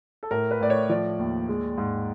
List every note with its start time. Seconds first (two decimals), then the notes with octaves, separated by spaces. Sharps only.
0.23 A4
0.31 A2 A#4
0.51 B4
0.60 A2 D5
0.70 C#5
0.89 F3 D5
1.19 D#2
1.48 G#3
1.78 G#2